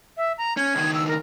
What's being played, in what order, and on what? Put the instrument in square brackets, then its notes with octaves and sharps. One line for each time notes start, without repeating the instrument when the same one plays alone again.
[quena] E5
A#5
[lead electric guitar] C#4 [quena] G#6
[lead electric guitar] C#2 D#3
[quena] E6
A#4